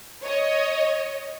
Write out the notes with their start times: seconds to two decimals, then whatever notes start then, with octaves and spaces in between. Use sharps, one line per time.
0.23 C#5 D#5